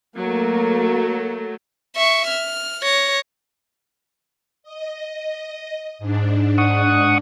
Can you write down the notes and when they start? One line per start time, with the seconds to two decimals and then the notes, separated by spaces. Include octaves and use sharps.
0.18 F#3 A3 A#3
1.96 E5 C#6
2.27 F6
2.82 C#5 A#6
4.63 D#5
5.99 G#2 D4
6.58 F#5 C#6 D#6